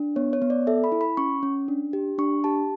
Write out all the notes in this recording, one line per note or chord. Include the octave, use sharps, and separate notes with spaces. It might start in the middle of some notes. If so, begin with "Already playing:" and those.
Already playing: D4
B3 C#5
C#5
B3
D5
A4 E5
B5
E4
B5
C#4 C#6
C#4
D4
G4
D4 C#6
G4 A5